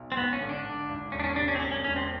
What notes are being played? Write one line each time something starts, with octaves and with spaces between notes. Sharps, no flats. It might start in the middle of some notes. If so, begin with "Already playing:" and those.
Already playing: B1
C4
G#1 B3
C#4
D3
D4
D3
G#1
E1 C#4
D4
C#4
C3 D4
C#4
C4
E1 C#4
C#4
E1 C#4
C4